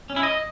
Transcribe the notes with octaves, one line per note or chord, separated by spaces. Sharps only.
C#4
E4
D#5